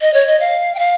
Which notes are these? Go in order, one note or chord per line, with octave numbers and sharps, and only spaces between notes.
D#5
C#5
D#5
F5
G5
F5